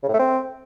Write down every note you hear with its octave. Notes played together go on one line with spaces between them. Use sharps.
C#3
A2
A3
C4